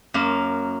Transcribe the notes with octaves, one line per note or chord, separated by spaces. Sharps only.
F#2 A#3